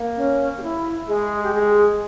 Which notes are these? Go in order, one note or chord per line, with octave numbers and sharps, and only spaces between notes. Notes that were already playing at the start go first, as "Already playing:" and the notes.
Already playing: A#3
C#4
G4
E4
G#3 G#4
G4
G#3 G#4